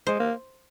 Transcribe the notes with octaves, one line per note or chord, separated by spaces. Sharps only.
G#3 C5
A#3